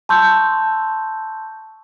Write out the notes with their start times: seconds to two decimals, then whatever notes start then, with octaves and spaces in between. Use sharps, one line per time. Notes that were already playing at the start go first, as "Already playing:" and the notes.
0.09 A5 C6 C#6 E6 G6